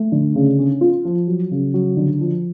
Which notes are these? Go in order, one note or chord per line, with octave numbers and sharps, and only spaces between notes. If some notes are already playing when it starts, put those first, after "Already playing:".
Already playing: A3
D3
C#3
C#4
F4
F3
F#3
C#3
F#3
D3
F3